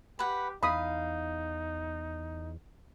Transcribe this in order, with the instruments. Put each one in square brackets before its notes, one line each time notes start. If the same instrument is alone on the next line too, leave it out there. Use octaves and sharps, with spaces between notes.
[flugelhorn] G4 [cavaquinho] B4 F#5
[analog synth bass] E2 [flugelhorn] D#4 [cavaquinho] F5 [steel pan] B5 D#6